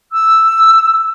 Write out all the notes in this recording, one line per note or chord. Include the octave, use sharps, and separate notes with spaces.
E6